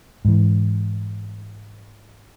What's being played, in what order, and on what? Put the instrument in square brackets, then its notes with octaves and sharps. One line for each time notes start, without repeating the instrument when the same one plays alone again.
[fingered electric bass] G#2 E3